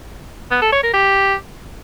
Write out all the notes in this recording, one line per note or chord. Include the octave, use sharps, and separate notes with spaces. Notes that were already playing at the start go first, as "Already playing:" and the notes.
B3
A4
C#5
A#4
G4